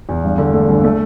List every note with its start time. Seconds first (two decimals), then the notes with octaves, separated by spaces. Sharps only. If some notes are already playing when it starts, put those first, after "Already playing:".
0.09 E2
0.23 G2
0.38 D3
0.54 A3
0.68 G1
0.84 A3